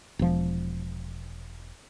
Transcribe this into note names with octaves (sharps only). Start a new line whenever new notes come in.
E1 F3